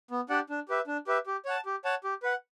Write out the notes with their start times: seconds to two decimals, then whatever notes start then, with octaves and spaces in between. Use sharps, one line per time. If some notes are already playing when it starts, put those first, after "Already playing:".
0.11 B3
0.29 D4 G4 D5 F#5
0.50 D4
0.69 G4 B4 E5
0.87 D4
1.07 G4 B4 E5
1.27 G4
1.45 C#5 F#5 A5
1.66 G4
1.85 C#5 F#5 A5
2.04 G4
2.23 B4 F#5